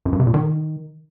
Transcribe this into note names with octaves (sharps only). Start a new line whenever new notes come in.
F#2
G2
C3
A#2
D#3